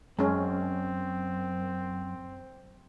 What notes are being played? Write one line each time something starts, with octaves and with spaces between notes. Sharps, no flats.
F#2 G#3 C4 C#4